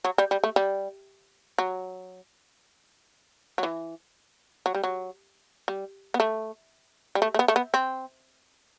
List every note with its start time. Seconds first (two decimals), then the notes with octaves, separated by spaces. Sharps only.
0.05 F#3
0.18 G3
0.31 G3
0.44 A3
0.56 G3
1.58 F#3
3.58 F#3
3.63 E3
4.66 F#3
4.75 G3
4.84 F#3
5.68 G3
6.14 B3
6.20 A3
7.15 G3
7.22 A3
7.34 A3
7.39 B3
7.48 A3
7.56 B3
7.74 C4